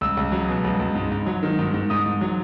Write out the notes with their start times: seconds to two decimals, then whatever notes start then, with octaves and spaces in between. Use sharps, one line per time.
0.01 C#2 E6
0.17 C#2
0.32 F#3
0.48 B2
0.64 C#2
0.80 C#2
0.95 G#2
1.12 G#2
1.27 F#3
1.43 D#3
1.58 G#2
1.74 G#2
1.90 G#2 D#6
2.05 G#2
2.21 F#3